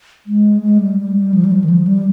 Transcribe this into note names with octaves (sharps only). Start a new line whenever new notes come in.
G#3
G#3
G3
G3
G3
F3
G3
F3
D#3
F3
G3